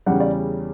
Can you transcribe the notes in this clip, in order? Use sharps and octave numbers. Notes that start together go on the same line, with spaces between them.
E2 C#3 G3 F#5
D5